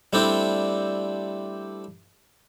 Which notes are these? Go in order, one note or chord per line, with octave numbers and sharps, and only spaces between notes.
G3 A3 C4 D4 E4 G4